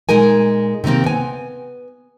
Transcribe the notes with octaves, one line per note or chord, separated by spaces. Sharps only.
A#2 G#3 D#4 A#4 G#5
C3 D#3 F3 A#3 C4
B3 G#5